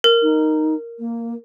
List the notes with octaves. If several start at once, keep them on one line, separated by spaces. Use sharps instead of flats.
A#4
D#4
A#3